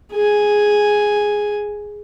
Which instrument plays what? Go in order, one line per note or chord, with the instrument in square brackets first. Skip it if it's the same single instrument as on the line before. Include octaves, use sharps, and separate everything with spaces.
[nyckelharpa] G#4 G#5